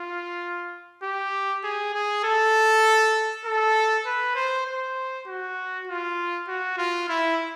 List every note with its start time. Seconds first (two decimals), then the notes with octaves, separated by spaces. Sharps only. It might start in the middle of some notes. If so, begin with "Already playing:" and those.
Already playing: F4
1.03 G4
1.64 G#4
1.94 G#4
2.24 A4
3.45 A4
4.06 B4
4.36 C5
4.67 C5
5.27 F#4
5.88 F4
6.48 F#4
6.78 F4
7.09 E4